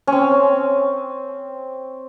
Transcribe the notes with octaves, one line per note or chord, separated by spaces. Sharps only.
C#4
C4